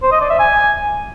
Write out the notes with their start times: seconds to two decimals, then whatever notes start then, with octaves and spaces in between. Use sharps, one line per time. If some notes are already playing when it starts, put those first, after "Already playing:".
0.03 C5
0.12 D#5
0.21 D5
0.30 E5
0.39 G#5